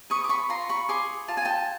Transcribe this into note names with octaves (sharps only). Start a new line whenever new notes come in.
B4 C#6 D#6
D6
B5 C#6
F4 A#5 C6
B5 C#6
G#4 C6 D6
F4 A5
G#5
G5 A5